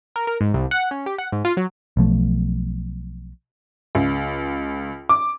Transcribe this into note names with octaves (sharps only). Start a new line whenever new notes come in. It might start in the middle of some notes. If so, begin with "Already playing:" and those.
A#4
A#4
G#2
C2
F#5
C#4
G4
F#5
G#2
F4
F#3
B1 F3 A3
C#2
D6